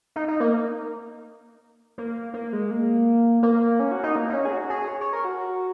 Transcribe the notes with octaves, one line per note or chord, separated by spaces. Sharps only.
D#4
D#4
A#3
A#3
A#3
G#3
A#3
A#3
C#4
F#4
D#4
A#3
D#4
C#4
G#4
F#4
G#4
C#5
C#5
A#4
F#4